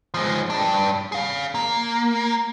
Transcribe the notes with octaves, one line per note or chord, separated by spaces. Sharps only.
F3 G#3
G2 D4
G#4 F5
A#3